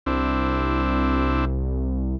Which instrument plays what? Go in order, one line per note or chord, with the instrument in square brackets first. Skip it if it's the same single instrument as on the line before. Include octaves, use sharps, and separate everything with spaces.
[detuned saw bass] C2 [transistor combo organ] C4 D4 E4